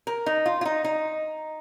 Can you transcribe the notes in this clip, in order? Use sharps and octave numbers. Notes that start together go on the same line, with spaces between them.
A#4
D#4
F4
F4
D#4
D#4